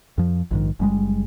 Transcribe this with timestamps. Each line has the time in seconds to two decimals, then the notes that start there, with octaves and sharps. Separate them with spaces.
0.18 F2 F3
0.51 A#1 G#2 D#3
0.80 F#1 G3 G#3